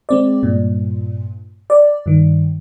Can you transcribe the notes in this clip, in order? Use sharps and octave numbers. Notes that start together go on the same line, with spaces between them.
G#3 C4 D5
G2 A#2
D5
G2 D#3